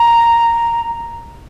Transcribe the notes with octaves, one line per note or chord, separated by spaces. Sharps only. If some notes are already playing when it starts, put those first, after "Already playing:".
Already playing: A#5